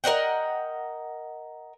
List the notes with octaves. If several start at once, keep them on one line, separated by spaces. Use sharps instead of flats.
A#4 D#5 F#5 G5